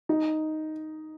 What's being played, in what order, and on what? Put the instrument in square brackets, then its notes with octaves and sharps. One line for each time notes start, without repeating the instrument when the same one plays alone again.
[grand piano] D#4